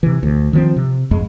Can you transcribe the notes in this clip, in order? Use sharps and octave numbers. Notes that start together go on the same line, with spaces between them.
C3 E3
D2
D#3 F3 C4
C3
G#1 F2 G#3